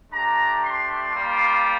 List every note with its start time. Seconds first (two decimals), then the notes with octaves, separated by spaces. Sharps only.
0.12 A3 D4 G4 A#5
0.63 C6
1.14 G3 A#3 F4